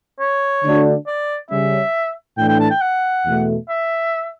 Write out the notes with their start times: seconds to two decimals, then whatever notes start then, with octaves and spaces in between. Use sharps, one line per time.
0.20 C#5
0.64 D3 A3 D4 F#4
1.07 D5
1.50 C#3 G3 C#4 E5
2.37 A2 E3 A3 D4 G5
2.49 G5
2.60 A5
2.70 G5
2.81 F#5
3.25 E2 B2 A3
3.69 E5